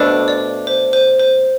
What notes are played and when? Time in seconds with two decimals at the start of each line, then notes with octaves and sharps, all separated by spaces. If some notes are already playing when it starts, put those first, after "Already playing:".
Already playing: B2 A3 D4 A4 C5
0.28 D5
0.67 C5
0.93 C5
1.19 C5